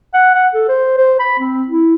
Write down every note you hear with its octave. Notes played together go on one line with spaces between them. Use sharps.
F#5
F#5
A4
C5
C5
B5
C4
E4